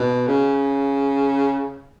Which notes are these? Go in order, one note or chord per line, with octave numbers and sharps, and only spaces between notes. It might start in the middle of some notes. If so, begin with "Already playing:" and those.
Already playing: B2
C#3